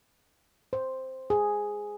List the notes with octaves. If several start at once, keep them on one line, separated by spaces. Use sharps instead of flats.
C5
G#4